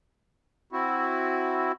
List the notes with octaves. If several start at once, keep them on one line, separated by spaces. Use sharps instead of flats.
C4 E4 F#4